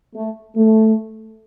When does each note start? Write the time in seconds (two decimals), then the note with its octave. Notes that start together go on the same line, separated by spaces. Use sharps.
0.15 A3
0.56 A3